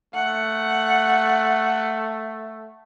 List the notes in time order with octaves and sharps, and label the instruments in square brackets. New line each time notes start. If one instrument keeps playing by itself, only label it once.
[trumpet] A3 [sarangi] F#5